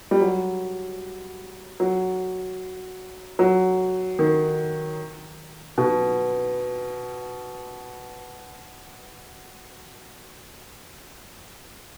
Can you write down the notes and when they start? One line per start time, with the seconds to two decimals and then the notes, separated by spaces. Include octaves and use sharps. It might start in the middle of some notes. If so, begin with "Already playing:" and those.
0.11 G3
0.21 F#3
1.80 F#3
3.39 F#3
4.19 D#3
5.78 B2